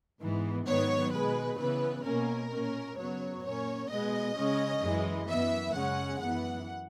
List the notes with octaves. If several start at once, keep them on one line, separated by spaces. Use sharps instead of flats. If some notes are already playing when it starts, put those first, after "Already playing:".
G#2 E3 B3
G#2 D#3 F#3 B3 C#5
B2 G#3 B3 B4
C#3 E3 B3 B4
B2 A#3 C#4 A#4
A#2 A#3 C#4
F#2 C#3 F#3 B3 C#5
A#2 A#3 C#4 C#5
B2 G#3 B3 D#5
C#3 G#3 C#4
F#2 E3 G#3
F#2 E3 B3 E5
F#2 C#3 G#3 C#4 F#5
F#2 E3 B3 F#5